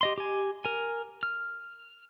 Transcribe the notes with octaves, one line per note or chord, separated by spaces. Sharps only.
G4 D#5 C6
G4 G#5
A#4 G#5
F6